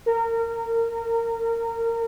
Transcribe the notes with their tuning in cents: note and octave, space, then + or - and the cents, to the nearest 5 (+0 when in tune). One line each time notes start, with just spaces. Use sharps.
A#4 -25